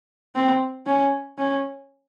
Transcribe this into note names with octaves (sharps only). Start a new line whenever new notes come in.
C4
C#4
C#4